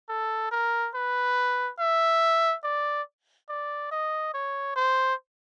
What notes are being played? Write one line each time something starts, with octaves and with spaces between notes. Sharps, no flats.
A4
A#4
B4
E5
D5
D5
D#5
C#5
C5